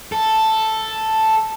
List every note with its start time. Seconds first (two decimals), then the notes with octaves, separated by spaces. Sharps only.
0.12 A4